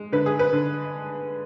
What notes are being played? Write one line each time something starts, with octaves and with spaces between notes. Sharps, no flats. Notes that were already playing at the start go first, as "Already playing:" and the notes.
Already playing: G#3
D3 B4
G#4
B4
D3